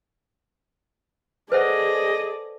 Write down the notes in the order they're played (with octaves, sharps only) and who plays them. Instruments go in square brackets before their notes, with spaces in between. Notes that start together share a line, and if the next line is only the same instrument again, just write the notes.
[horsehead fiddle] G#4 [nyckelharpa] A4 D5 [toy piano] B4 C5 F#5 [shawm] D#5